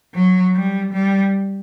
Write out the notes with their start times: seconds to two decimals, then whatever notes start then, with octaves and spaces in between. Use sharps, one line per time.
0.14 F#3
0.54 G3
0.93 G3